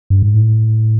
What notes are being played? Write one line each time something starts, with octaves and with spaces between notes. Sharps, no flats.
G2
G#2
A2